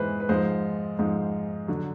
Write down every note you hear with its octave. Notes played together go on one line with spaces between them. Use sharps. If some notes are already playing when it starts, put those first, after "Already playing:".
Already playing: G#2 E3 G#3 B4 C5
B4
G#2 F3 G#3 C5
G#2 F3 G#3
D3 F#3